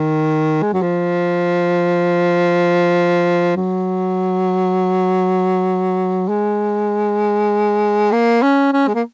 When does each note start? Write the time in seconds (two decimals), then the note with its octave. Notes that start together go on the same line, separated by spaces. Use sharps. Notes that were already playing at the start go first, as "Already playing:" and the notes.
Already playing: D#3
0.62 G#3
0.73 F#3
0.82 F3
3.56 F#3
6.29 G#3
8.12 A#3
8.42 C#4
8.73 C#4
8.88 G#3
8.95 A#3